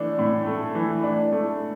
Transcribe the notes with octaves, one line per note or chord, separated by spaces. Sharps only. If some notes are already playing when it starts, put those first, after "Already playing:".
Already playing: E3 A3 D4
A2
A3
E3
D4
A3